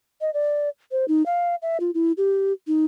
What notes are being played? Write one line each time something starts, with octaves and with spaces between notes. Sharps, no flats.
D#5
D5
C5
D#4
F5
E5
F4
E4
G4
D#4